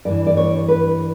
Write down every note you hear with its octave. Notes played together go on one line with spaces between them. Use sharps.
G2 E3 D5
D5
C#5
B4